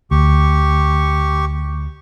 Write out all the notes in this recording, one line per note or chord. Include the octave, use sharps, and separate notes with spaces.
D2 G4 C#6